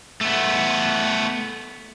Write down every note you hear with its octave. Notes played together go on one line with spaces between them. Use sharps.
A3 B3